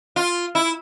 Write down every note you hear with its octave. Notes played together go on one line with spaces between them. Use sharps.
F4
E4